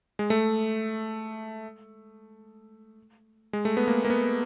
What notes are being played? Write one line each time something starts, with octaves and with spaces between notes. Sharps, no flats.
G#3
A3
G#3
A3
B3
A#3
A#3
B3